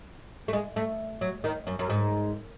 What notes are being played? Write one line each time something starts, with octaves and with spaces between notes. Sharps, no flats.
A3
G#3
A3
F#3
D#3
F#2
F#2
G#2